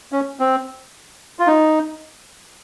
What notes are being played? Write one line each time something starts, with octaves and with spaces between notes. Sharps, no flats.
C#4
C4
F4
D#4